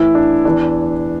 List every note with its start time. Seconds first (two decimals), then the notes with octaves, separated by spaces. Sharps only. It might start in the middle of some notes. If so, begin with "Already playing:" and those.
Already playing: A2 E3 E4
0.15 D4
0.45 E2 E3 D4